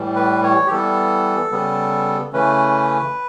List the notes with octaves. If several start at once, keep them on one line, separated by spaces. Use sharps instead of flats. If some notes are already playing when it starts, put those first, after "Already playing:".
Already playing: A2 E3 G3
B4
C#5
G4
E3 G3 B3 A4
C#3 G3 B3
C#3 E3 A3 C#4 B4